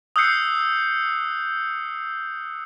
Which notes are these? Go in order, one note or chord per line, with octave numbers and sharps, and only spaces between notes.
D#6 E6 F#6 G6 C7 C#7